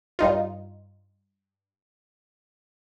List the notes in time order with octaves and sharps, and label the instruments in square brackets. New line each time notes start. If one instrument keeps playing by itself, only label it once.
[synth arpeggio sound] G2 D#4 F4